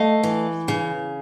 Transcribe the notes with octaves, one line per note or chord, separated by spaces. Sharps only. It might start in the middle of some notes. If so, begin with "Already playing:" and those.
Already playing: A3 D#5 F5
E3
C#3